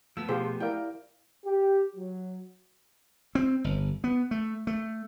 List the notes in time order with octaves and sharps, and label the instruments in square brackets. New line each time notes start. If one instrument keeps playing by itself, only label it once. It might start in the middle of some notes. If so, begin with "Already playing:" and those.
[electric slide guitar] F3 A3 B3 [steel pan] E6
[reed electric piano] B2 G#4 [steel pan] F4 G4 C5
[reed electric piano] E4 D5 F5 [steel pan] A#4 G5
[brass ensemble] G4
F#3
[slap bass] C4
G1
B3
A3
A3